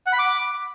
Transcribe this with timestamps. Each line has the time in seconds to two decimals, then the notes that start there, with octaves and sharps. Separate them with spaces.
0.07 F#5
0.13 B5
0.19 D6